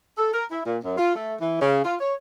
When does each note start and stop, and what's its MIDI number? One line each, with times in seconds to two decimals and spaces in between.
0.18 0.29 69
0.33 0.45 70
0.51 0.60 64
0.66 0.77 46
0.83 0.96 42
0.97 1.13 65
1.15 1.33 57
1.40 1.57 52
1.60 1.80 49
1.84 1.95 65
2.00 2.14 73